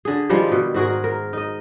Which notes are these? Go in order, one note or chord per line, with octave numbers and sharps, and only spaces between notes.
D3 G#4
D#3 F3 G3 G#3
B2 G4
G#2 F#4 G#4 A#4
A#4
D#4 D#5